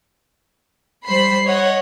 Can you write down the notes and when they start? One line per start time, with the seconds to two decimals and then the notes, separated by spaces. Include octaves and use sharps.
1.07 G3 C5 B5 C7
1.46 C#5 D#5 F#5